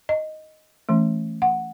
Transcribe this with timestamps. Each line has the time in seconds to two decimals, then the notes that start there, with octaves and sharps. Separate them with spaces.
0.09 D#5
0.89 E3 A3 C#4
1.42 F#5